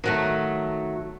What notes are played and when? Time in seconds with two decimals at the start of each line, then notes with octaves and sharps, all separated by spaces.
0.04 D#3 F#3 A3